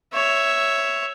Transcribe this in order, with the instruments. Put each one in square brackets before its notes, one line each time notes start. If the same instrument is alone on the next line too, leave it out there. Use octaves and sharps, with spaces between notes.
[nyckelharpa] C#5 E5